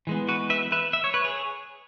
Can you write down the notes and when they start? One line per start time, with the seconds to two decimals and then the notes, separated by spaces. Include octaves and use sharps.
0.07 E3 G#3 B3
0.29 F#4 B4
0.50 B4 E5
0.72 B4 E5
0.93 E5
1.04 C#5
1.14 B4
1.24 G#4 C#5